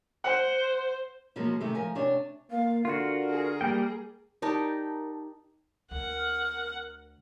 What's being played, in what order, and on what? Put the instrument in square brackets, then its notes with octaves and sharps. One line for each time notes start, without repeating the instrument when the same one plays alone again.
[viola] C5 [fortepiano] F#5
[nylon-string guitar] B2 F3 F#3 G#3 A#3
C3 D#3 G#3 A3
F3 A#4 G#5
C3 D4 C#5 G#5
[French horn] A#3 [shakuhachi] F5
[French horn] D3 [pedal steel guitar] F4 F#4 [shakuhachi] A#4
[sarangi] G#4
[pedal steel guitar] G3 A#3 G5
[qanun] D#4 G4 D5 [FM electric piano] A#4 A5 A#5
[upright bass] D2 [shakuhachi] A#4 [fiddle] F#5